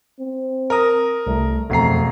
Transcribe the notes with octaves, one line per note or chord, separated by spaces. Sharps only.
C4
A#4 A#5 D#6
C2 A3
E1 F2 A3 C4 A#5 C7